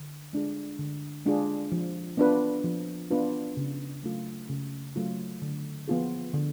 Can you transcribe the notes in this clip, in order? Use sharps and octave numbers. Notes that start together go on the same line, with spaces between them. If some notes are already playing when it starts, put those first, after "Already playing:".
Already playing: D3
G#3 D4 F4 G#4
D3
G#3 D4 F4 G#4
F3
B3 D4 F4 B4
F3
B3 D4 F4 B4
C#3
F#3 A3 F4
C#3
F#3 A3 F4
D3
F3 B3 F4 G#4
D3